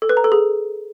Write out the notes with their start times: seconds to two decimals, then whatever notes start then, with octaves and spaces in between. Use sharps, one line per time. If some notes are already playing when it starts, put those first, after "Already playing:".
0.02 A4
0.09 B4
0.17 A#5
0.24 A4
0.32 G#4